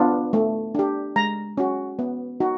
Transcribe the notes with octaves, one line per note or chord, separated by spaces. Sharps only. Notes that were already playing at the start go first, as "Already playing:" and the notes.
Already playing: B3 D4 F4
A3
D4 G4
G#3 A#5
C#4 F#4
B3
D#4 F#4